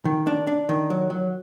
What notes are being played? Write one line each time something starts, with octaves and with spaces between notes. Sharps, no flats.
D#3
D4
D4
D#3
F#3
F#3